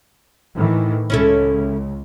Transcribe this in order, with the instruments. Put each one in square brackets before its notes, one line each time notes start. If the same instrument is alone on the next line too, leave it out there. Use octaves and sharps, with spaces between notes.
[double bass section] A2 D#3 E3
[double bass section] C#2 [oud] C#4 E4 A4